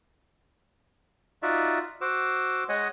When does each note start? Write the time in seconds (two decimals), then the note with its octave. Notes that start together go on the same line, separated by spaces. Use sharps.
1.43 D#4 F4 F#4 D5 E5
2.01 F#4 C5 D6 E6
2.69 G#3 C#5 D#5 F#5 G#5